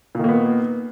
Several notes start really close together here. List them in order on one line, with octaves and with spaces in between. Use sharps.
A#2 D#3 A#3 B3